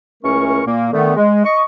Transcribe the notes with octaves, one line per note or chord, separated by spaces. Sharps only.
C#2 E3 A3 C#4 A#4 C#6
A#2 A#3
D3 D#3 A3 B3
G#3
D#5 C#6